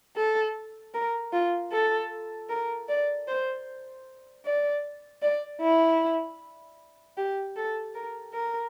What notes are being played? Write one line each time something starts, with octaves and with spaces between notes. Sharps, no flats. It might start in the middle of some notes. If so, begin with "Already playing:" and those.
A4
A#4
F4
A4
A#4
D5
C5
D5
D5
E4
G4
A4
A#4
A#4